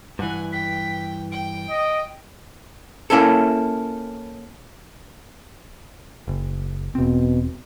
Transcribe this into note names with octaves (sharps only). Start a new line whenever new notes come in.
G2 E3 F#5 G#5
G5 B6
G5 D7
D#5
A#3 C#4 E4 A4
F#1
E1 B2 C4